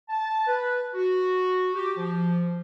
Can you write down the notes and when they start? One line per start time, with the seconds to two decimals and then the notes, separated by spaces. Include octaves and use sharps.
0.09 A5
0.47 B4
0.95 F#4
1.75 G4
1.97 F3